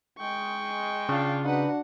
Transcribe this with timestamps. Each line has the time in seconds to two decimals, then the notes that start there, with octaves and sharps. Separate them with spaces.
0.19 G#3 G5 C#6
1.09 C#3 D4 F4
1.45 D4 D#4 F#4 B4 F#5